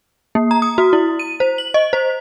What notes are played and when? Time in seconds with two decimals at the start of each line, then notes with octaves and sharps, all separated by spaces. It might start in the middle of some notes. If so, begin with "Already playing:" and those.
0.35 A#3
0.51 A#5
0.62 D#6
0.78 F#4
0.93 E4
1.19 D#7
1.40 C5
1.58 F#7
1.74 D#5
1.93 C5